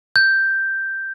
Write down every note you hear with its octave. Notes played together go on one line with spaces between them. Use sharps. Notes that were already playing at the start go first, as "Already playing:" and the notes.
G6